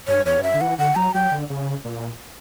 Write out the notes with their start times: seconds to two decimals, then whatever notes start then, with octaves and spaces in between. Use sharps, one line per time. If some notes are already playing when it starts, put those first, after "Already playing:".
0.08 G2 C#5
0.25 E2 C#5
0.39 G2
0.43 F#2 E5
0.54 D3
0.61 E3 F#5
0.78 D3 F#5
0.96 F#3 A#5
1.14 F#3 G5
1.32 D3
1.50 C#3
1.85 A#2